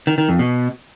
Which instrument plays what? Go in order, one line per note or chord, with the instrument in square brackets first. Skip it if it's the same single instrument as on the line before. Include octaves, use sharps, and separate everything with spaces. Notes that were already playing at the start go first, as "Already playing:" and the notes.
[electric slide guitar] D#3
D#3
F2
B2